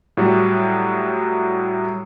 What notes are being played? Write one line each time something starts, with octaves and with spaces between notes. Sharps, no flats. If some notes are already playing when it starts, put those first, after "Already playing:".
A2 F#3 G3